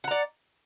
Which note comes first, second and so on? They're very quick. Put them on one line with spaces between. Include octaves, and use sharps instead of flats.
F#5 A#5 D5